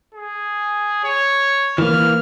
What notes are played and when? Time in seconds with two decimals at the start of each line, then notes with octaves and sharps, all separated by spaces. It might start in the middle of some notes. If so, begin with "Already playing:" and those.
0.15 G#4
1.04 C#5
1.78 E3 A#3 F6